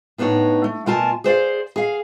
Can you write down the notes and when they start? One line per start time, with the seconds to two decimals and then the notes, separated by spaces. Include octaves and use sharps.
0.18 A2 B3 D4 D#4 C#5
0.64 A3
0.86 B2 A3 F4 A#4 G#5 A5
1.24 G#4 C5 D5 F5
1.76 G#4 F5